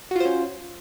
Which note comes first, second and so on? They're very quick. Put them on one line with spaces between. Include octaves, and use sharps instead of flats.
F#4 F4 C5 C#4